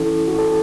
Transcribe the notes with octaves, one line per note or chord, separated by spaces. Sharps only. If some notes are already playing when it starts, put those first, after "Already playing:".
Already playing: E3 C#4 E4 A4
F#4
A4